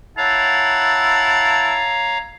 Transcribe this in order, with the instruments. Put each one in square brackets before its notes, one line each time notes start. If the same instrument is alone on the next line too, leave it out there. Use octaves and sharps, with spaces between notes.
[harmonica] E4 F#5 [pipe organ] C#5 F5 A#5 [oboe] A5